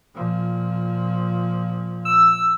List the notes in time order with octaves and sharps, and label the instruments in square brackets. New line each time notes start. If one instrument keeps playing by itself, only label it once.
[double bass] A#2 F3
[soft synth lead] E6